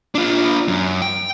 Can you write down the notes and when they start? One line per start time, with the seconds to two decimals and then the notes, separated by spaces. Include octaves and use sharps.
0.15 D4 F4
0.68 F#2
1.02 G5